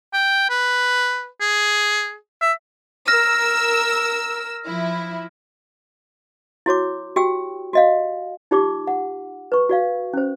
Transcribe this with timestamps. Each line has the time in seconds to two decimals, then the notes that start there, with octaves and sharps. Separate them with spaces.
0.13 G5
0.50 B4
1.41 G#4
2.41 E5
3.08 A#4 E6 F6 A#6
4.66 F3 E4
6.66 E4 F#4 C#5 D6
7.16 F#4 G4 G5 E6
7.73 F#4 D#5 F5
8.51 D#4 F4 G4 D5 C6 D6
8.87 F#5
9.52 B4 C#6
9.69 F#4 D5 F5
10.13 C#4 C5